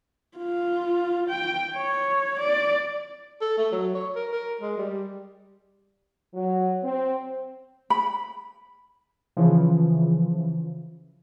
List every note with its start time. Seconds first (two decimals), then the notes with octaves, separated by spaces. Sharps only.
0.38 F4
1.29 G5
1.75 C#5
2.39 D5
3.41 A4
3.57 A3
3.72 F#3
3.95 C#5
4.15 A#4
4.32 A#4
4.61 G#3
4.77 G3
6.34 F#3
6.84 C4
7.90 B5
9.37 C#3 E3 F3